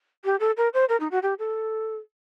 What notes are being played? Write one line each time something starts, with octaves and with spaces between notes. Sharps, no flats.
G4
A4
A#4
C5
A#4
D#4
F#4
G4
A4